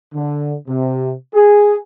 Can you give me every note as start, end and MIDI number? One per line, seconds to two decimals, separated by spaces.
0.14 0.55 50
0.68 1.12 48
1.33 1.77 68